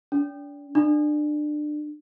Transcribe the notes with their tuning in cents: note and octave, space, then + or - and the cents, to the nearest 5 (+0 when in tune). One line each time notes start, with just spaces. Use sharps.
D4 -35
D4 +25